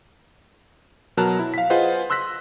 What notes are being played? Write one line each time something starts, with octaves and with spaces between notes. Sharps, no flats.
B2 F#3 A#4 A5 A#5 F#6
E4
F5 B6
F4 G#4 B4 C5 D#5 F#5
C6 E6 F#6 A#6 B6